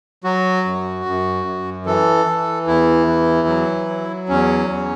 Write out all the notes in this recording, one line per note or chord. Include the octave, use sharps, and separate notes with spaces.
F#3 F#4
F#2
F#2
F#2
E3 A4
E3
E2 E4
E3
F#3
F#3
E2 C#4
E2